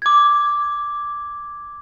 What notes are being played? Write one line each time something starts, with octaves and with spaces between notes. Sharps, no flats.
D6 G#6